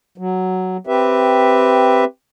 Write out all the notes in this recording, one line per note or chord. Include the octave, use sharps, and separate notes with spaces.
F#3
C4 G4 B4 E5